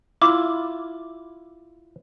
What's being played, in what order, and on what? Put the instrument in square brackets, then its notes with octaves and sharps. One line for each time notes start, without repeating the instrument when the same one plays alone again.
[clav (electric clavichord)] E4 F4 [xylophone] D6